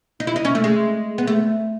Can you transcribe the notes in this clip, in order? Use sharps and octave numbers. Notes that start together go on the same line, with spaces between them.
D#4
E4
D#4
C#4
A3
G#3
B3
A3